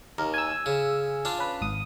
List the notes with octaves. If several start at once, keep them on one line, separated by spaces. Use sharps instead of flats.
D#2 A#4
G#5 E6
C#3
D4 F4
C#4 B4
G#1 D#6